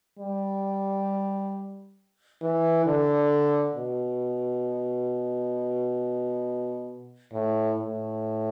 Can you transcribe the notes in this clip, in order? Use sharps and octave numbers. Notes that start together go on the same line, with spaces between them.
G3
E3
D3
B2
A2
A2